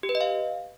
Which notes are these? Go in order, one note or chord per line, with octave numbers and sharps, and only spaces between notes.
G4
B4
D#5
F5